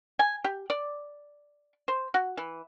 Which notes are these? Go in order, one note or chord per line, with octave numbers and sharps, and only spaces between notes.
G#5
G4
D5
C5
F#4
E3